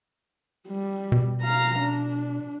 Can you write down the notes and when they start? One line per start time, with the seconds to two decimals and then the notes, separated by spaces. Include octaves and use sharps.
0.68 G3
1.12 B2
1.42 F5 A#5
1.79 D4